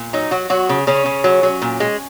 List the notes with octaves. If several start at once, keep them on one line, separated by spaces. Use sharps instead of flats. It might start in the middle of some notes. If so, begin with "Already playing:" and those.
Already playing: A#2
F#3 D#4
F#3 F#4
F#3 F#4
C#3
C#3 C#4
C#3
F#3
F#3
A#2
G#3